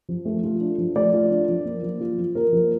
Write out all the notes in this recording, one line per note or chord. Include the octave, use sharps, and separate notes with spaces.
F3
A3
F4
D4
F3
A3 D5
F4
D4
F3
A#3
F3
F4
F3
A#3 A#4
F3